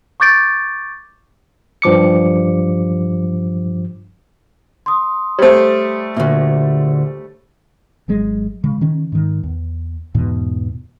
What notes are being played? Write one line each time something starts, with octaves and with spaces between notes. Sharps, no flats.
C#6 D6 G6 A6 D7
G2 F3 D6 C#7
C6 D#6
G3 A3 C5 C#5
D2 A#2 E5
G#1 F#3 G#3
C#3 G#3
D#3 C#4
G#2 D#3
E2
E2 G#2 B2 E3